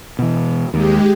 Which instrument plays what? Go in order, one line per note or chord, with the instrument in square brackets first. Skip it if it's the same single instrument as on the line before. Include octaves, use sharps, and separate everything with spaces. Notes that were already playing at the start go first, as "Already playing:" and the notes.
[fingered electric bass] B2 E3
[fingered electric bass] D#2 [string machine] G#3 G4